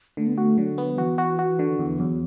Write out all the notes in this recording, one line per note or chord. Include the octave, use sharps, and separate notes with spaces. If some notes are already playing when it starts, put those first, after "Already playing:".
D3 A3
B3
A3 F#4
D3 F#3
B3
F#3
E3 F#4
F#4
F#4
D3
E2 E3
E2 F#3